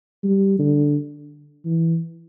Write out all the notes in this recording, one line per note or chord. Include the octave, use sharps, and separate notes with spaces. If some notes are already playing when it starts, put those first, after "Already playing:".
G3
D3
E3